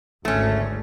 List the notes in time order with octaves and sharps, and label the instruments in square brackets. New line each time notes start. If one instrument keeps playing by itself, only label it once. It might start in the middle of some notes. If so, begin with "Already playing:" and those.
[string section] G#1 D2 [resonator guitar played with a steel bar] A3 C#4